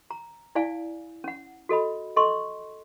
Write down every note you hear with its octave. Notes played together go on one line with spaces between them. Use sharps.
A#5
E4 D5 F5 G#5
C#4 F#5
F#4 A4 D#5 B5
A4 D#5 C6 C#6